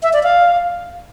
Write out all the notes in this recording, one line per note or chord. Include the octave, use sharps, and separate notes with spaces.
E5
D5
F5